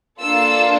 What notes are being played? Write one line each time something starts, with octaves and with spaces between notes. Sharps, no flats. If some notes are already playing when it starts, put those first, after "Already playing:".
A#3 D4 F4 A4 E6